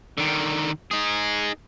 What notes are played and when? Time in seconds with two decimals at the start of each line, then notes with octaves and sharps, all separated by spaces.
0.18 D3 D#3
0.91 D#4 G#4